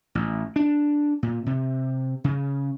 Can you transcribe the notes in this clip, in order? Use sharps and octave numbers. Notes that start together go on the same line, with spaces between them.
A1
D4
A#2
C3
C#3